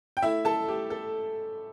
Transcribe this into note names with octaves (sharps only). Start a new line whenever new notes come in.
G5
A3 E4 E5
A4 A5
A3 G4
A4